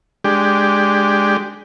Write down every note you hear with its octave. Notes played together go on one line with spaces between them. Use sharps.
G#3 D4 G4